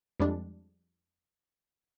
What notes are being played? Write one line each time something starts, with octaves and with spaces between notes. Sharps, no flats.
F2 G3 G#3 D4